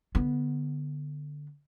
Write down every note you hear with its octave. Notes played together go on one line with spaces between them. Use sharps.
D3 B3